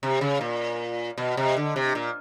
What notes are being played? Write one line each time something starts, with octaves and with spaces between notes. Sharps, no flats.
C3
C#3
A#2
B2
C3
D3
C3
A#2